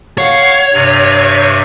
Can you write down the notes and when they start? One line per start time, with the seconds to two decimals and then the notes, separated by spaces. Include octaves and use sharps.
0.18 C#5 F5 F#5
0.73 G2 C3